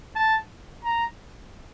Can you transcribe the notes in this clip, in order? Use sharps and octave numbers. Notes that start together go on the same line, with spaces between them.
A5
A#5